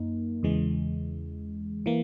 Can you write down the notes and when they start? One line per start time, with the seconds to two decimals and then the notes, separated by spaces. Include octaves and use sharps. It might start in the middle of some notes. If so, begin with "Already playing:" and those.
Already playing: F#2 A#3 D#4
0.43 E2 C#3 E3 G#3
1.86 E3 A#3